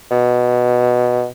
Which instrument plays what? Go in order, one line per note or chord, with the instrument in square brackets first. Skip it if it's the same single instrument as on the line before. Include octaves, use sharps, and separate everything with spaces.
[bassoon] B2